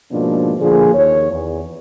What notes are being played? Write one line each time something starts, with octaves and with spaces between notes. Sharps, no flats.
G#2 B2 F3 A#3 D4 D#4
A#2 D3 F3 A#3 G#4
D#2 C#5
E2